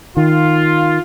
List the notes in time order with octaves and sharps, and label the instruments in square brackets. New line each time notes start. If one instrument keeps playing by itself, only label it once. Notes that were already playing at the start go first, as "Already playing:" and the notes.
[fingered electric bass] D#3 [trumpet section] F4